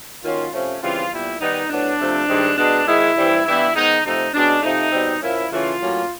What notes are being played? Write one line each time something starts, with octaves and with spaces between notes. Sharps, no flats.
D#3 F#3 A#3 C#4 F4
C3 F3 A3 C#4
C#3 E3 G3 C4 F4
A#2 G3 B3 E4
D#3 G3 B3 D#4
A2 F#3 B3 D4
C3 F3 A3 C4
G2 D#3 G#3 C4
B2 G#3 B3 D4
G#2 D#3 G#3 E4
G2 E3 G3 C4
G2 E3 G3 B3 E4
G#2 D#3 G#3 B3 D#4
C3 F3 A3 D#4
B2 G#3 C#4 D4
C3 F3 A3 D#4
B2 G3 C4
A#2 F3 A#3 C#4 E4
C#3 E3 A3 C#4 F4
A2 F#3 A#3 C#4